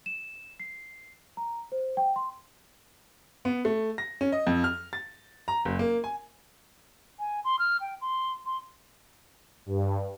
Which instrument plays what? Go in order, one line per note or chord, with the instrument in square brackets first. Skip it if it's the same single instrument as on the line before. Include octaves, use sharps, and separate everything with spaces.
[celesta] E7
C7
A#5
C5
G5
C6
[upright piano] B3
A3
A#6
C#4
D#5
F2
F6
A6
A#5
F#1
A#3
G#5
[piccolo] G#5
C6
F6
G5
C6
C6
[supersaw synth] G2